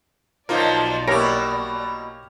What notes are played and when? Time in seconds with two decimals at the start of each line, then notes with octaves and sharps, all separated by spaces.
0.49 B1 B2 F3 F#3 D#4 F4 A#4 D5
1.07 B2 A#3 E4 G4 A#4 C#5 A#6 D7